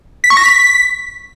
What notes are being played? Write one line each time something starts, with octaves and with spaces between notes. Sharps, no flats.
B6
C#6
A#6
B6